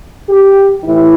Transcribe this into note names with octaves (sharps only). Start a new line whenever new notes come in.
G4
A2 E3 E4